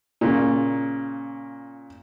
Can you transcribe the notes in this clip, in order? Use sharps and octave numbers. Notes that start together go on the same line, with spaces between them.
A#2 C#3